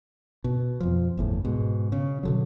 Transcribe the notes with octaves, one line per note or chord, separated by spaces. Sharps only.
B2
F2 F3
G1 E2 A2
G#2 B2
C#3
B2 D3 F#3